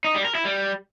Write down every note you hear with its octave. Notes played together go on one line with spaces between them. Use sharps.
D#4
G3
A#4
E4
G3